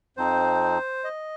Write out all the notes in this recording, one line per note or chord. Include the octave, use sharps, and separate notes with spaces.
F2 F3 C4 D#4 C5
D#5